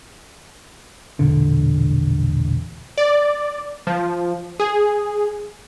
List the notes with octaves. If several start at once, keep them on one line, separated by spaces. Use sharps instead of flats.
E1 A#1 D3
D5
F3
G#4